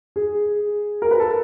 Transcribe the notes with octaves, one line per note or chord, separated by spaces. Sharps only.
G#4
A#4
B4
A4